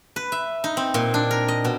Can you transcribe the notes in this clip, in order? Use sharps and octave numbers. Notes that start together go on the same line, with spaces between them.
B4
E5
D#4
C4
A#2
D4
A#4
D#5
B2